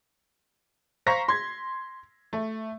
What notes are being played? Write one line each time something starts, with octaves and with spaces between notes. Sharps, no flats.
C5 F5 A#5 C#6 A#6 B6
C6 G#6
A3